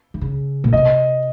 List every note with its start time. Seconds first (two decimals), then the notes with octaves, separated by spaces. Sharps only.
0.14 D#3
0.21 C#3
0.64 A#2
0.73 C3 D#5